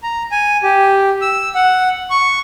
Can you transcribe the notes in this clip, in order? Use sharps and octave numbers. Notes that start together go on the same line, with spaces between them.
A#5
G#5
G4
E6
F#5
C#6